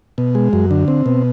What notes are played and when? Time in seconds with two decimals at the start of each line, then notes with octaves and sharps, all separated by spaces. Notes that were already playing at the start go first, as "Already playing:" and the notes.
0.18 B2
0.35 G#3
0.53 F#2
0.71 D3
0.88 C4
1.06 B2